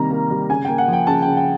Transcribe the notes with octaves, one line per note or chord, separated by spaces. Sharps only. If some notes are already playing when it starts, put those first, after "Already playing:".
Already playing: C3 D#3 G3 A#3 A#5
A#3
G3
C#3 G#5
A#3 G5
F#5
F3
G5
C#3 A5
C#3 G5
G5